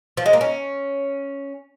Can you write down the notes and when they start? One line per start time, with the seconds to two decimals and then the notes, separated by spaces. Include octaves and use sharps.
0.17 F3
0.26 G#3
0.33 A#3
0.41 C#4